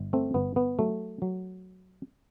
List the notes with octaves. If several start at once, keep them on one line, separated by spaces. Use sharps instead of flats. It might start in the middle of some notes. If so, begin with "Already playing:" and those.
Already playing: G1
A3 C4
G1 B3
B3
F#3 A3
F#3